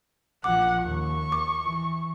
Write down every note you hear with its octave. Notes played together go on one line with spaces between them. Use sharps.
A#1 F3 F#5 D6
D#2 C#6
D6
E3